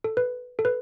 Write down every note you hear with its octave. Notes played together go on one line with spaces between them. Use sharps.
A4
B4
A4
B4